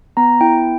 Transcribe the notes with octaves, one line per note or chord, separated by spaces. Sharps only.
B3 A#5
E4 G5